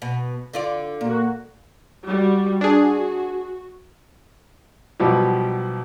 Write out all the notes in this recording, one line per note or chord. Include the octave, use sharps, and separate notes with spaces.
B2
D3 F4 D5
A#2 A#3 F#4
G3 F#4
D4 F#4 G#4
B1 B2 F3 G3 G4